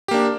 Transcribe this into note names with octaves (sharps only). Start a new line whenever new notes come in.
A#3 D4 G4